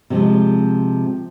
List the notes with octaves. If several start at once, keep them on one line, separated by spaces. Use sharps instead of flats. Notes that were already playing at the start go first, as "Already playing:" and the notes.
C3 F3 G#3